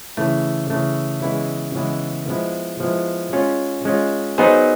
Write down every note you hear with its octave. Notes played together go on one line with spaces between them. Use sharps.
C#3 E3 A3
C#3 E3 A3
C#3 E3 G#3 B3 E4
C#3 E3 G#3 B3 E4
F3 G#3 B3 E4
F3 G#3 B3 E4
G#3 C#4 F4
G#3 C#4 F4
F#3 B3 D#4 G#4 C5